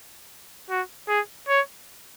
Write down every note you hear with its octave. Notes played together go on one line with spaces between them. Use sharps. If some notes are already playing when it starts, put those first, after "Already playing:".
F#4
G#4
C#5